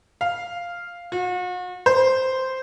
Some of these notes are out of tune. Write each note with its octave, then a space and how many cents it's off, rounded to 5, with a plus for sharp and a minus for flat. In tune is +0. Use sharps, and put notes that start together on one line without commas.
F5 -5
F#4 -40
C5 -5